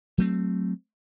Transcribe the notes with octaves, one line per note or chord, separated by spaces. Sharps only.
F#3 A3 C4